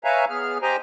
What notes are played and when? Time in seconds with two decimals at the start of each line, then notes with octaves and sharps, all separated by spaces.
0.04 B4 C#5 E5 F5 G#5 A#5
0.30 B3 G#4 F6
0.62 G4 C5 D#5 G5 G#5 A#5